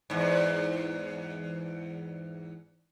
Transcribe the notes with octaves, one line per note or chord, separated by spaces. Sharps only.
E2 G#2